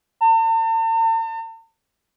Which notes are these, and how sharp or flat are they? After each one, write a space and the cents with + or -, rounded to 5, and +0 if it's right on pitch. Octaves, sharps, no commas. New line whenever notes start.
A5 +45